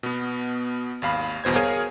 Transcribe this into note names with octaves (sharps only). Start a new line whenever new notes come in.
B2 B3
G#1 D#2 F5 B5
G1 E2 B2 C5 G#6
G#4 A#4 C#5 F5 G#5